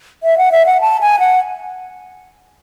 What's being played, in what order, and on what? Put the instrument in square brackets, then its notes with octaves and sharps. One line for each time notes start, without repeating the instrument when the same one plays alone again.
[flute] E5
F#5
E5
F#5
A5
G#5
F#5